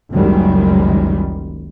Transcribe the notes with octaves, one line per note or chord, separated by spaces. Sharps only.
F#1 C#2 F#2 D#3 G3 G#3